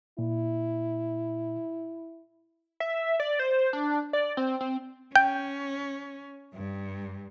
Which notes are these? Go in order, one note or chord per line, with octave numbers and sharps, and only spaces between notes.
A#2 E4
E5
D5
C5
D4
D5
C4
C4
C#4 G5
G2